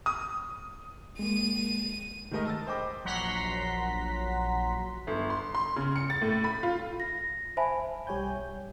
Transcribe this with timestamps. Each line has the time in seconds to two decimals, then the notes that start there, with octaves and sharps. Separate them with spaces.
0.06 D#6
1.19 G#3 A#3 D#7
2.31 D#3 G#3 A3 A#4 D#5
2.45 A5 E6 A6
2.67 C5 D#5 G5 B5 D6
3.05 A#1 F#3 F#5 A#5 C6 B6
5.07 G1
5.30 C6
5.55 C6
5.76 C#3
5.96 C#7
6.10 A6
6.22 A2
6.44 B5
6.63 F4
7.00 A#6
7.57 C5 E5 F5 G#5 A5 B5
8.07 B1 G3 G4 C#5 G#5 G6